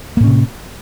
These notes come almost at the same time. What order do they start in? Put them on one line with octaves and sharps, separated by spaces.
A#3 A2 C#4 C3